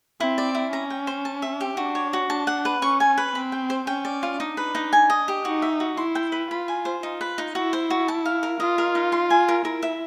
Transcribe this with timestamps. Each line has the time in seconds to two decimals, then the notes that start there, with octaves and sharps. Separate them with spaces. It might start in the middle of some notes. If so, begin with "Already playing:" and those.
0.20 C4 E4
0.38 D5
0.55 E4
0.72 C#4 A#5
0.90 G5
1.07 C5
1.25 A5
1.42 E5
1.61 G4
1.77 D4 F#4
1.95 C#5
2.13 F#4
2.30 D4 A5
2.47 F#5
2.65 B4
2.82 C#4 C#6
3.00 G#5
3.18 B4
3.35 C4 B5
3.52 G5
3.70 C5
3.87 C#4 G5
4.05 D5
4.23 F4
4.40 D4 D#4
4.57 B4
4.75 D#4
4.93 G#5
5.10 D#5
5.28 G4
5.45 D#4 F#4
5.62 E5
5.80 F#4
5.97 E4 C6
6.15 G5
6.32 B4
6.50 F4 B5
6.68 G#5
6.85 C5
7.03 D#4 F4
7.21 B4
7.38 D#4
7.55 E4 F#4
7.73 C5
7.90 F#4
8.08 A5
8.25 F5
8.43 A#4
8.60 F4 D#5
8.78 A#4
8.95 D#4
9.12 C6
9.30 G#5
9.48 A#4
9.65 E4 A#4
9.83 E5